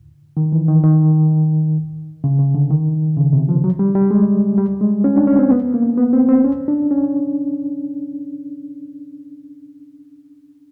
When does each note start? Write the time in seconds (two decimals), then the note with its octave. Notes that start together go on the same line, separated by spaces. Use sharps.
0.37 D#3
0.52 E3
0.68 D#3
0.84 D#3
2.24 C#3
2.39 C#3
2.55 D3
2.70 D#3
3.17 C#3
3.33 C3
3.49 F3
3.64 F#3
3.79 G3
3.95 G3
4.11 G#3
4.58 G3
4.81 G#3
5.04 C#4
5.16 D4
5.27 C#4
5.39 C4
5.51 B3
5.74 A#3
5.98 B3
6.13 C4
6.29 C4
6.44 C#4
6.68 D4
6.91 C#4